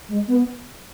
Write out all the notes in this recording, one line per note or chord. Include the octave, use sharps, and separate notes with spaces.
G#3
B3